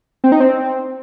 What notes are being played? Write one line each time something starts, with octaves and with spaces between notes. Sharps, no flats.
C4
D#4
C4